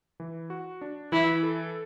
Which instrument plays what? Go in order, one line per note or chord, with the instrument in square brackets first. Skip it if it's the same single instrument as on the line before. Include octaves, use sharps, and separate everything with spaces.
[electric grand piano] E3
F#4
D4
[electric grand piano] E3 [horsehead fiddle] E4
[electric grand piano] A4